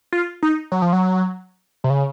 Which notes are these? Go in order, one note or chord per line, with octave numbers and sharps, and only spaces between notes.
F4
D#4
F#3
F3
F#3
C3
C#3